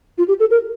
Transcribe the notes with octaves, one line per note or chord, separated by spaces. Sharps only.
F4
G4
A4
A#4